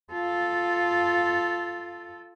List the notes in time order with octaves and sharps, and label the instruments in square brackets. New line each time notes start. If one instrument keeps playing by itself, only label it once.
[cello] F4 A4